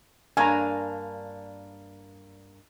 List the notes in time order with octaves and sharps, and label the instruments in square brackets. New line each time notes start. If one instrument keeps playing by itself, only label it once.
[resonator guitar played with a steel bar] G2 A#3 D4 [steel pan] G#5 A#5